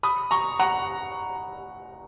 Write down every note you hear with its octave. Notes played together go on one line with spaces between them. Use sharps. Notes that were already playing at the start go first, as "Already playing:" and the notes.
B5 D#6
A#5 C#6
F#5 A#5